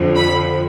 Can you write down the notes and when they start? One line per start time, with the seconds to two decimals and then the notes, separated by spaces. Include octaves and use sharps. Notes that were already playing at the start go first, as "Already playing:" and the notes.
Already playing: F2 D3 F3
0.16 B5